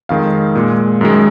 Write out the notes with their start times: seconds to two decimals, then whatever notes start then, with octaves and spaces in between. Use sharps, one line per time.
0.09 F2 D#3 G#3 F5
0.55 A#2 G#3
1.01 F#2 D#3 G#3